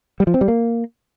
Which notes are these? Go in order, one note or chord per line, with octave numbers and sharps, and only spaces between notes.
G3
F3
C4
G3
A#3